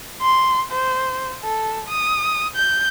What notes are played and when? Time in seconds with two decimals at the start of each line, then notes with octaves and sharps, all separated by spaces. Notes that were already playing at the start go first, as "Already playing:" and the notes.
0.22 C6
0.71 C5
1.43 A4
1.88 D#6
2.56 G6